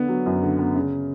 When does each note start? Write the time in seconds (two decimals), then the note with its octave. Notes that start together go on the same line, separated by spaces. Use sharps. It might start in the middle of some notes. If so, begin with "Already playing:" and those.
Already playing: D3 B3
0.08 F#3
0.26 F#2
0.43 D3
0.59 B3
0.76 C#3